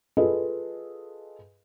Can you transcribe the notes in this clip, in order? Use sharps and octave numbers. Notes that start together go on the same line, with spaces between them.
F4 G#4 A4 B4 D#5